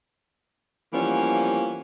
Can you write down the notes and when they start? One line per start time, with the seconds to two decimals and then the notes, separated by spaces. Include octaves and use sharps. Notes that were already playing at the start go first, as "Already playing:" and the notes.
0.93 E3 F3 G3 A#3 B3 C#4